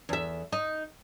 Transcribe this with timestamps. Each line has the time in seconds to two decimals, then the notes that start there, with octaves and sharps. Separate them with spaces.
0.09 E2 E5
0.52 D#4